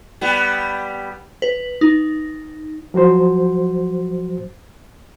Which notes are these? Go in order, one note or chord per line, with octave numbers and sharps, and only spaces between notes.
G3 B3
B4
D#4
F3 F#3 F#4 C5